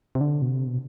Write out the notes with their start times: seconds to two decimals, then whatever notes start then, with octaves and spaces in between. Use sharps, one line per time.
0.15 C3
0.21 D3
0.42 B2
0.49 C3
0.67 B2